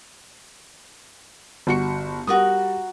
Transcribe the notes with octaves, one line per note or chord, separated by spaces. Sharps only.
G1 F#4 C#7
G3 F#4 A#4 D#6